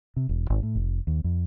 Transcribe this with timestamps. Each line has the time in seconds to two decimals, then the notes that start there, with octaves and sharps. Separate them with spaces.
0.16 C3
0.29 E1
0.50 G#1
0.63 A2
0.75 F1
1.07 D#2
1.24 F2